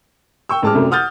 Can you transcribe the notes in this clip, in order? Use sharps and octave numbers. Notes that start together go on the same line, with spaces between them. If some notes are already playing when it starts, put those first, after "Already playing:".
G5 C#6 E6
A1 G#3 A5 D6 F6
C2 F#2 C3 A3
F#5 D#6 F6 G6 A6